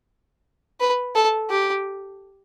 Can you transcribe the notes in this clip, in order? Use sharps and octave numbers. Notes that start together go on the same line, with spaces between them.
B4
A4
G4